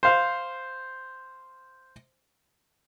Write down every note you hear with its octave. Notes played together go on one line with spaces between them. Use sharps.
C5 F5